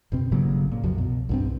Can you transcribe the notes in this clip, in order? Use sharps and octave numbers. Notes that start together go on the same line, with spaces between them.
F#1 B2 C4
G1 C#3 F#3 A#3
A#2
C2 F#2 F3 F#3
B2
C2 G2 C4